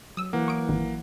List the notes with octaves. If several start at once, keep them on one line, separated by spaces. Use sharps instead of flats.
F#3 D#6 E6
E3 A#3 F#5
C#6 D#6 D7
A1 F2 D#3